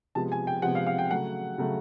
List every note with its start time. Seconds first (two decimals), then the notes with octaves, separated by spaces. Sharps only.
0.15 C3 F3 G#3 B3 A5
0.32 G#5
0.47 G5
0.62 C3 F3 G#3 B3 F#5
0.75 F5
0.87 F5
0.98 G5
1.11 C#3 F#3 A3 F#5
1.58 C#3 F#3 A3